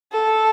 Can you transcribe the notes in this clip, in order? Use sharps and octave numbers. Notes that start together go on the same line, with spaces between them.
A4